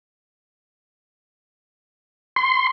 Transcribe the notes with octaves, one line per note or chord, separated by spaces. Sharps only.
C6